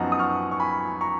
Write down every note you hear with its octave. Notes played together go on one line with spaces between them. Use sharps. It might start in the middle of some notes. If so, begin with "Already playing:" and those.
Already playing: F#2 F3 B3 D#4 F#5 A#5
D#6
C#6 F6
C#6
G#5 B5
A#5 C#6